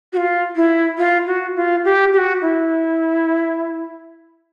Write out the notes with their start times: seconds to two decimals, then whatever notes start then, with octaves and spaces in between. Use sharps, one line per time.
0.13 F#4
0.17 F4
0.56 E4
0.98 F4
1.27 F#4
1.56 F4
1.85 G4
2.13 G4
2.18 F#4
2.42 E4